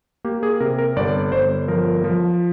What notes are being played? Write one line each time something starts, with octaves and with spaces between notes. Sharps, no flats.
A#3 G4
G#4
C3 A#4
A#4
G1 D5
G1 C5
F3 A#4
F3